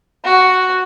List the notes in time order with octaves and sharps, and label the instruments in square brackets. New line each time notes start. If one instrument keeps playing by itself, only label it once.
[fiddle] F#4